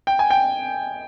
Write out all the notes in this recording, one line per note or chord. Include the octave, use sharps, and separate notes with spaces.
G5
G#5
G5